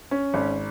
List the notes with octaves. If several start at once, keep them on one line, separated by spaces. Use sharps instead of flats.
C#4
G#1